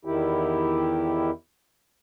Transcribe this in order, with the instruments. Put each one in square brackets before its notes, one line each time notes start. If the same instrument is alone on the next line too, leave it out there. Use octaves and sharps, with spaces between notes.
[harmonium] E2 D#3 E4 G4